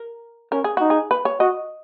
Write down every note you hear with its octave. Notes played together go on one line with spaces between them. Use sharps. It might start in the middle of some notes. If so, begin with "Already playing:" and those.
Already playing: A#4
C#4 A#4
G#4
D#4 F#4
G#4
B4
C#5
F#4 D#5